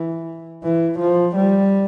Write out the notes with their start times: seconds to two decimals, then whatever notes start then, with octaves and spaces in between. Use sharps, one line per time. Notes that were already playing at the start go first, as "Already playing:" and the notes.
Already playing: E3
0.64 E3
0.99 F3
1.36 G3